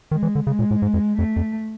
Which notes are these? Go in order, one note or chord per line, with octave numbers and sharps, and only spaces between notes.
D#3 G#3
E3
D3
C#3 G#3
A#2
A2
G#2
F2
F2 A3
F2